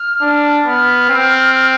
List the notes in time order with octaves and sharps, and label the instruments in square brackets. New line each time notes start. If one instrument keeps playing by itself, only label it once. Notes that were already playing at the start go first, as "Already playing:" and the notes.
Already playing: [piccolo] F6
[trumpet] D4
[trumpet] B3 [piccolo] F6
[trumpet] C4